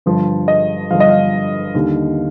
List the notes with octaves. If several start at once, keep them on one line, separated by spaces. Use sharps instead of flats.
G1 G2 F3
D#5
G1 G2 F3 F5
D#5
F5
D#2 D3 G3